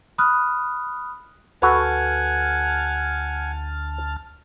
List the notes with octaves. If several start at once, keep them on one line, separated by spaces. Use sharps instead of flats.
B5 D#6 F6 F#6
D2 F#4 A4 B4 F#5 G#5 A5 F6